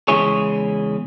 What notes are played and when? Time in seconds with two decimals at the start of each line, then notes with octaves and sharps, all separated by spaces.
0.08 E2 C#3 G#3 E4 G#4 C#5